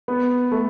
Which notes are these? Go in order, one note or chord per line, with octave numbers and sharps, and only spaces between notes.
B3
A3